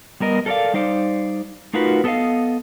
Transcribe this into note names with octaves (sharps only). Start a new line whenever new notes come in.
G3 B3 A#4 D#5
A4 A#4 C#5 D5 F5
G3 D#4 C5 D5 F5
A3 D#4 F4 F#4 A#4 B4
B3 A4 A#4 D#5 F5